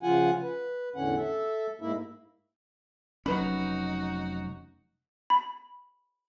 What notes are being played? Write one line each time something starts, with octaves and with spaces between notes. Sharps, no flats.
C#3 F3 F4 F#5 G#5
B4
E2 A2 D3 C#4 F#5
A4 E5
G#2 A#3 E4 E5
F1 F#3 C#4 D#4 F#4 B4 B5
B5